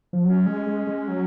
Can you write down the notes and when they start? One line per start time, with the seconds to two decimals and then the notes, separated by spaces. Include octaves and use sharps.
0.13 F3
0.24 F#3 C#4
0.46 G#3
0.67 G#3
0.87 G#3
1.08 F#3